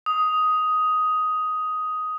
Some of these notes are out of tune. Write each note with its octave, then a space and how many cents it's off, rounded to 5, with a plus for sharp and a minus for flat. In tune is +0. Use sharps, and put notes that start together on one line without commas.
D#6 +10